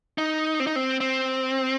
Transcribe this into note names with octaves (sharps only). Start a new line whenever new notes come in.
D#4
C4
D#4
C4
C4